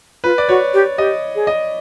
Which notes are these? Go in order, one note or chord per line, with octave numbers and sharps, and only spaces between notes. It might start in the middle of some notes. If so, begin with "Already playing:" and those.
F4 B4
D5
F#4 C#5
G4
G4 D#5
G#4
D#5